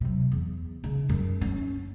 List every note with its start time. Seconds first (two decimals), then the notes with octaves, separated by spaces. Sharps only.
0.01 C3 F#3
0.32 E2
0.84 C#3
1.09 F#2 G#3
1.41 C#4